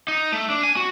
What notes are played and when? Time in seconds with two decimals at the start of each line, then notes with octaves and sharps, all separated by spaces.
0.08 D#4
0.33 A3
0.50 D4
0.64 G#5
0.77 F#4